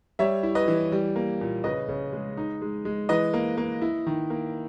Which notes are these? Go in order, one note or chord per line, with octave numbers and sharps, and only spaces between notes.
G3 C#5 E5
E4
B4 D#5
E3
G3
A#3
A#2
C#3 B4 D#5
C#3
G#3
D#4
G#3
G#3
E3 B4 D#5
A#3
A#3
E4
D#3
A#3